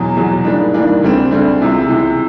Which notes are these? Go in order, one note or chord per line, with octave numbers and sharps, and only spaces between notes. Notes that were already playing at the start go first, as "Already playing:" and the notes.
Already playing: E2 B2 F#3
E2 B2 F#3
G#2 E3 G3 A#3 D4
G#2 E3 G3 A#3 D4
D2 D3 G3 C4
D2 D3 G3 C4
C#2 C3 E3
C#2 C3 E3